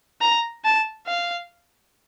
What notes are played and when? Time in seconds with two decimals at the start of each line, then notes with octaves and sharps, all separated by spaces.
0.21 A#5
0.64 A5
1.07 F5